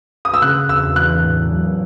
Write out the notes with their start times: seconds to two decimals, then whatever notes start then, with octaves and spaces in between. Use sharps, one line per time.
0.25 D#6
0.34 E6
0.42 C#3 F#6
0.69 E2 E6
0.96 E3 F#6
1.23 A2
1.50 F#3